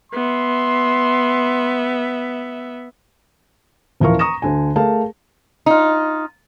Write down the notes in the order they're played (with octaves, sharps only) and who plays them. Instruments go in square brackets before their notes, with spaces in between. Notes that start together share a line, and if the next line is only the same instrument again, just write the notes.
[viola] B3 E5 [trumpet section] C6
[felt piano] D#1 E3 F3 A#4 F5 C#6
A#5 C#6 D#6 A#6 E7
D2 D3 G#5
A3 G#4 A#4 F5 A5
[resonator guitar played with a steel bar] D#4 F4